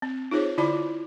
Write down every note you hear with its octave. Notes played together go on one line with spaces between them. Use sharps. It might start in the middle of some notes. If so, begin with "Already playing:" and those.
C4
D#4 F4 G#4 C5 C#5
D3 E4 F4 D5 A5 B5
F4